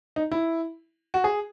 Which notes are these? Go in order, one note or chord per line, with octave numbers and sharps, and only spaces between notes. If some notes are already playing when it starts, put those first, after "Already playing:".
D#4
E4
F#4
G#4